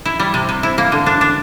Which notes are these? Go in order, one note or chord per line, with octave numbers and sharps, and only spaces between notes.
E4
G3
C3
C3
E4
A#3
D3
D4
D4